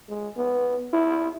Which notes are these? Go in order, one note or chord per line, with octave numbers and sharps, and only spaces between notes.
G#3
B3
E4